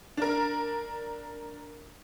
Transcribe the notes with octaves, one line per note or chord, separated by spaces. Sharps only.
D4 A#4